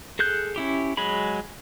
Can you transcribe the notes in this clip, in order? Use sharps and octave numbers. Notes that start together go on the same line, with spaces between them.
G#4 A4 F#6 G6
C#4 E4 G4
F#3 G#3 G#4 B5